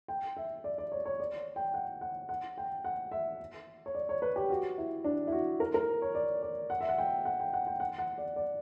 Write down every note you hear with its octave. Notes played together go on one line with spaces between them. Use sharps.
G5
E5
D5
D5
C#5
C#5
D5
G5
F#5
F#5
F#5
G5
F#5
E5
C#5
D5
C#5
B4
G4
F#4
E4
D4
E4
F#4
A#4
A#4
C#5
D5
D5
F#5
E5
F#5
G5
F#5
G5
F#5
G5
F#5
F#5
D5
D5